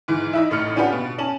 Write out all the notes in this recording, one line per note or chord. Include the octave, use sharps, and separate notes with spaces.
G#2 E3
D#4 E4 E5
A1 A2 D#4 F6 C#7
C#4 D4 F4 G4 B4 F#5
B2
C#4 A5 F#7